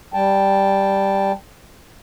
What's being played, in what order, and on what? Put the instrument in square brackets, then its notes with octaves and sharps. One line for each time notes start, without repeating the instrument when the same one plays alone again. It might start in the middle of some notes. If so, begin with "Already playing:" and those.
[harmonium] G3 G5 A5